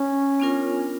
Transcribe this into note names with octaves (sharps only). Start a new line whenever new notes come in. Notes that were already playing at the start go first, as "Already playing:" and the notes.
Already playing: C#4
B3 D4 F4 A#4